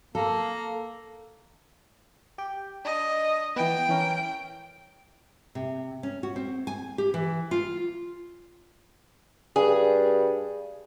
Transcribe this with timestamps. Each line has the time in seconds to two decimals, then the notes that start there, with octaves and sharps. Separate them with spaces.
0.15 A#3 A4
2.38 G4 G5
2.85 D4 D#5
3.56 E3 B3 G5
3.89 E3 C#4 A#4
5.55 C3
6.03 C#4
6.23 F#4
6.36 C4
6.67 G#5
6.98 G4
7.14 E3
7.51 F4
9.56 G2 G#4